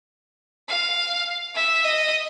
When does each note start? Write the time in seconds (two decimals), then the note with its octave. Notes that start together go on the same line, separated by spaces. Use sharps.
0.69 F5
1.55 E5
1.85 D#5